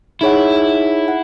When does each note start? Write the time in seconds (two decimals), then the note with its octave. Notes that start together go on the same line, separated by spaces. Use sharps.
0.21 D#4 E4 G#4 C#5 F#5
1.08 F#5